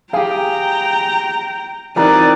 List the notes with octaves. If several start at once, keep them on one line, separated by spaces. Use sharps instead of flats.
G4 G#4 F5 G5 A#5
E3 C4 D#4 F4 G4 A#4 D5 A#5